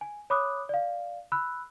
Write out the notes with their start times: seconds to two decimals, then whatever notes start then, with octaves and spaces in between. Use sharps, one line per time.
0.01 G#5
0.30 C#5 B5 D6 D#6 F#6
0.69 D5 F5
1.32 B5 E6 F#6